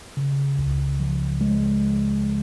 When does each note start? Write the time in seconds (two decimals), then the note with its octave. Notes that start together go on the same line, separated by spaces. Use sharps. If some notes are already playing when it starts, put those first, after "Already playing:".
0.17 C#3
0.59 C#2
1.00 F3
1.41 G#3